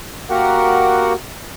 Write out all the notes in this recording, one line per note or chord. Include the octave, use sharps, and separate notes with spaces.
A#3 F#4 G4 A#4 F#5